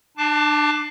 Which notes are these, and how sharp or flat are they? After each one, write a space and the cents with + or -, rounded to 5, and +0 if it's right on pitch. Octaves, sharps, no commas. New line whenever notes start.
D4 +35 A5 +0 D6 +0